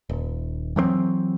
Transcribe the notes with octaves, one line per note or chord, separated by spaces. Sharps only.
D#1
E3 F#3 G#3 C4